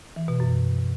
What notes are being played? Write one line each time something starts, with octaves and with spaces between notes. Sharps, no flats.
E3
B2
F#2